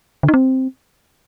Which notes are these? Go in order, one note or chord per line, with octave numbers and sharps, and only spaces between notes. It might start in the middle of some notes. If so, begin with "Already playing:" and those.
D3
D#4
C4